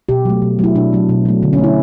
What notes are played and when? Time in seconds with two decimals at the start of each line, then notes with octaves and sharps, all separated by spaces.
0.09 B2 G4
0.25 F#3 A3
0.42 B2
0.59 F#3 A3 E4
0.75 B2 D4
0.93 F#3 A3
1.09 B2
1.25 F#3 A3
1.43 D3
1.53 C#4
1.58 A3
1.64 E4